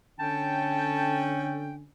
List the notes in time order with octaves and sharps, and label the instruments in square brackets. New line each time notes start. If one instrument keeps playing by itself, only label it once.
[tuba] D3 [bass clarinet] C#4 [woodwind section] A4 C#5 G5 [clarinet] A5